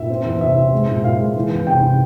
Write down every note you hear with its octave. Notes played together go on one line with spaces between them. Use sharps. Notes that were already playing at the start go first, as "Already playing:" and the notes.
Already playing: A#2 E5
C4
E2
C3 E5
C4
G#3
A#2
A#2 F5
G#3
E3
E2
C3 G5
C3